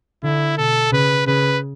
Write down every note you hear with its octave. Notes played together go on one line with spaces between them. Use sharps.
D3 E4
B2 A4
C#3 B4
C#3 B4